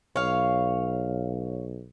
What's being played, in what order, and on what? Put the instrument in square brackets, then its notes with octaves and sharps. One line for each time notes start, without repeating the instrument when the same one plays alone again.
[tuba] B1 [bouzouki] C#5 F5